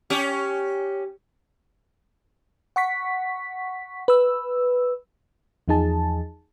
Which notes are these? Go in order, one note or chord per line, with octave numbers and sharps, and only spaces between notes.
C#4 G4
F#5 C#6 B6
B4 E6
E2 F3 D#4 G#4 A5